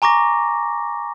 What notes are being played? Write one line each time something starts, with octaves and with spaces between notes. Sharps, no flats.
G#5 A#5 C#6 D6 A#6